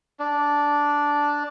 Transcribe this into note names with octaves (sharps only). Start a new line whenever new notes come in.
D4